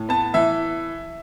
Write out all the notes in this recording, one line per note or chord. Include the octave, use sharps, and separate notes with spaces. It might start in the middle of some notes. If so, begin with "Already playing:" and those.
Already playing: A2
B3 A5
E3 E5